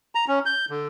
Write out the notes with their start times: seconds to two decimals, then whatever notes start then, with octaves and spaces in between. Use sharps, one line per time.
0.15 A#5
0.28 C#4
0.46 G6
0.70 D3